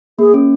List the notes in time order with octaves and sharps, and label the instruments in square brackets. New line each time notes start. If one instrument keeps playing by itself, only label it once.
[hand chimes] A#3 [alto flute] G#4
[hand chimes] C#4